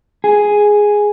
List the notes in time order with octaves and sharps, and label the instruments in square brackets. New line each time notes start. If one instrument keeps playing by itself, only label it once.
[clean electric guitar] G#4